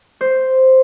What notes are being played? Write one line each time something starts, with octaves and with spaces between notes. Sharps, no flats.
C5